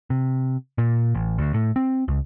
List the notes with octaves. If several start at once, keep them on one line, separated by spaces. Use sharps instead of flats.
C3
A#2
A1
D2
A2
C4
C#2